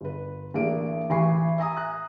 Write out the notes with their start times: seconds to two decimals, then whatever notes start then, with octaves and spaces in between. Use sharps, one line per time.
0.01 G1 B4
0.54 A1 A#3 D4 G#4 D7
1.10 A1 E3 G#5 B5 C#6 C7
1.58 E5 G#5 A#5 D#6
1.77 F#6